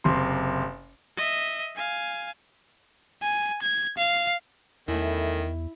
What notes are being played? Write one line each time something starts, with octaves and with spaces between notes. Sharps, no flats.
F#1 C3 C6
D#5 E5
F5 G#5
G#5
G#6
F5
E2 D#3 A3 C#4 E4